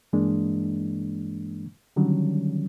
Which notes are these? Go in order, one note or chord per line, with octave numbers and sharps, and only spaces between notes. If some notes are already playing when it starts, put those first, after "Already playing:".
G2 E3 G#3 A#3 D4
D3 D#3 F#3 G3 C#4